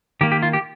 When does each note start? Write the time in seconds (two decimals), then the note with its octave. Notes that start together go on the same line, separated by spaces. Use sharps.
0.21 D#3 A#3 G4
0.32 G4
0.43 F4
0.53 G4